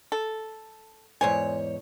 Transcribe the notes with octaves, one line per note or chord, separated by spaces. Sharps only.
A4
E2 G#2 C5 C#5 G#5